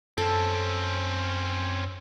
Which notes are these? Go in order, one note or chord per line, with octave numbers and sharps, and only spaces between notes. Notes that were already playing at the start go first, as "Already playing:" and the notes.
F#2 C4 C#4 A4